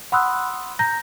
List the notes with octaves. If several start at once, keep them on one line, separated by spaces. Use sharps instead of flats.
F#5 B5 C6 D#6 E6 F#6
A#5 G6 A#6